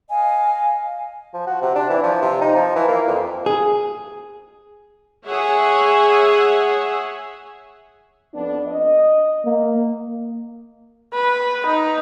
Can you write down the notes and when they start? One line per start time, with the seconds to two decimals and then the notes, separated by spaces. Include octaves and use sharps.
0.10 D#5 F5 G#5
1.34 F3
1.47 F#4
1.62 C3
1.75 D4
1.90 E3
2.03 F3
2.22 C3
2.41 D#4
2.56 F3
2.75 E3
2.88 A#3
3.08 F2
3.46 G#4
5.26 G#4 C#5 E5 F#5 G#5
8.34 F2 B3 D4
8.66 D#5
9.45 A#3
11.13 B4
11.66 D#4